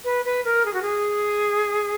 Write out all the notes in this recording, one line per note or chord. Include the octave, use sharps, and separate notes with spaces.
B4
B4
A#4
G#4
F#4
G#4